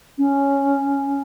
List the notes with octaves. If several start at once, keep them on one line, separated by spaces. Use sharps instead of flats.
C#4